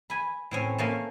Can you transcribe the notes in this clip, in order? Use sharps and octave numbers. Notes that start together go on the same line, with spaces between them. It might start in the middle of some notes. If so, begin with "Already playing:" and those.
G#5 B5
A2 C4 C#4
A3 A#3 C#4